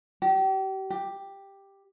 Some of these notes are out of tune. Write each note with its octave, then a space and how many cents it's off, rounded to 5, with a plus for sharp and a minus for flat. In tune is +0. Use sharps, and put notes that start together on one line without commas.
G4 -35
G4 +5